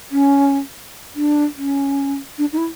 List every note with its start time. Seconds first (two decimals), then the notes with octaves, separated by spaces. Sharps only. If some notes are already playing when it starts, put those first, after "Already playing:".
0.12 C#4
1.15 D4
1.57 C#4
2.38 D4
2.53 D#4
2.58 E4